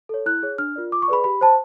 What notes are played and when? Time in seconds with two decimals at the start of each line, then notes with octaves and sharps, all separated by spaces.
0.09 A4 C#5
0.26 E4 F#6
0.43 G#4 C#5
0.58 D4 F6
0.76 F4 A#4 D5
0.91 F4 D6
1.02 C#6
1.08 G#4 B4 D5 B5
1.24 G4 B5
1.41 C5 A5